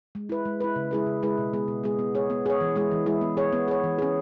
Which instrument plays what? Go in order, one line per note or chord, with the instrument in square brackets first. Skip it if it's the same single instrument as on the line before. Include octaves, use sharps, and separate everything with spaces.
[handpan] G#3
E4 B4
G#3
E4 B4
C#3
G#3 E4 G#4 B4
C#3
G#3 E4 G#4 B4
B2
G#3 B3 G#4
B2
G#3 B3 G#4
B3
G#4 C#5
B3
G#4 C#5
E3
G#3 E4 G#4
E3
G#3 E4 G#4
B3
G#4 C#5
B3
G#4 C#5
E3
C#4 G#4